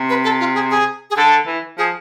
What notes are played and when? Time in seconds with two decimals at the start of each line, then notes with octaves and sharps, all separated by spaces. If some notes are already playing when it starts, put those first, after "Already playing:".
Already playing: C3
0.09 B4
0.24 A4
0.40 F4
0.54 G#4
0.70 G#4
1.10 G#4
1.16 D3 A4
1.47 E3
1.78 F3 G#4